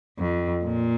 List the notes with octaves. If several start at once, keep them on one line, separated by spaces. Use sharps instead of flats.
F2
A#2